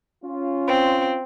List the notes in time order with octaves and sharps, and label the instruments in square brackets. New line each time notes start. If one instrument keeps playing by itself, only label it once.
[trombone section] C#4 F4
[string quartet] C4